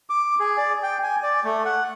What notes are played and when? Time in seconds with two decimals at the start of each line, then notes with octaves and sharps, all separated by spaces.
0.10 D6
0.40 G#4
0.57 D5
0.83 G5
1.03 G#5
1.23 D5
1.44 A3
1.65 F#5